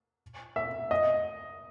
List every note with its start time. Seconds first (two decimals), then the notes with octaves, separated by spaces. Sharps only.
0.56 E5
0.91 D#5